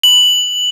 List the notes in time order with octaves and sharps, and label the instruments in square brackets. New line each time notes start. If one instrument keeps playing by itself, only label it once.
[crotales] F#7